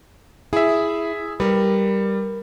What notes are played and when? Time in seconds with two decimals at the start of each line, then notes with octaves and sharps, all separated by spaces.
0.53 E4 G#4 E5
1.40 G3 A#4 B4